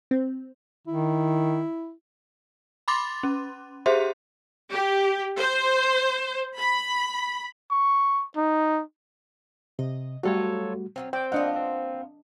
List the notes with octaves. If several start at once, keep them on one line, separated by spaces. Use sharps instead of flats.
C4
D#3 E4
B5 C6 D6 A6
C#4
G4 G#4 C5 E5 C6
G4
C5
B5
C#6
D#4
C3 D#5
F#3 G3 A3 F4 F#4 A4 C5 C#5
F#3 A#3 C4 C#4
C4 C5 D5 G5 G6
A#3 B3 D4 F4 D#5 F#5
C4